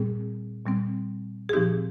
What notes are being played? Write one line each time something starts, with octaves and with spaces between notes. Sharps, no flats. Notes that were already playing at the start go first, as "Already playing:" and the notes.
Already playing: A#2 G3 C4 G#4
A#2 G3 C4
G#4
A#2 F3 C4 D#4 G4